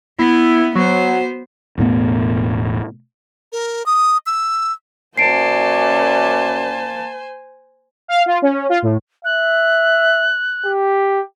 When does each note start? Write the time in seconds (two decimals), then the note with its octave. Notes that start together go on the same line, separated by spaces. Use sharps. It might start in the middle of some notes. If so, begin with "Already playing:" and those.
0.19 B3 E4
0.75 F#3 B3 C5
1.78 E1 A2 A3 B3
3.52 A#4
3.86 D#6
4.26 E6
5.18 F#2 A#3 C5 D5 G#5 A5 C7 D7
8.08 F5
8.26 F4
8.42 C#4
8.69 F4
8.82 A2
9.25 E5 F#6
10.65 G4